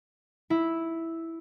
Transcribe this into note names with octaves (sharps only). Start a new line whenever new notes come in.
E4